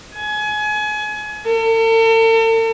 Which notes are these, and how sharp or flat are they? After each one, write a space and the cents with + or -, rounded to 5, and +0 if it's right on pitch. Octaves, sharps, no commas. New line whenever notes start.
G#5 +30
A4 +45